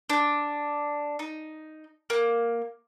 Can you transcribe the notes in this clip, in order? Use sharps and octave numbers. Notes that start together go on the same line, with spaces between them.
D4
D#4
A#3